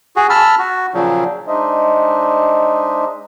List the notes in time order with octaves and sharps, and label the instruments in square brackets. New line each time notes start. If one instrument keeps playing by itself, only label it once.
[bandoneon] F#4 G#4
A5 B5 E6 F6
F#4
A#2 C#3 F3 F#3
[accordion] G#3 D4 D#4 C5 D#5 E5